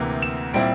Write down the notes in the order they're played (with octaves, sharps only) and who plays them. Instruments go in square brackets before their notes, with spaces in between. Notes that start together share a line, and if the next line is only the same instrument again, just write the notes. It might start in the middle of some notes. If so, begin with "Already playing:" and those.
Already playing: [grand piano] D2 C3 E3 A#3
E7
A#2 G3 C4 E4 D7